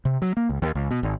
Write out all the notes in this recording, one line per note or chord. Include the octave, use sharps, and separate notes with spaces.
C3
F#3
A#3
C#2
D#2
C#2
B2
G#1